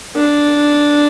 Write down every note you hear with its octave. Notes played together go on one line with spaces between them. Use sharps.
D4